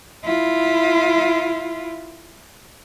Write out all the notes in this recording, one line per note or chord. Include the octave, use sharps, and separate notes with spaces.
E4 F4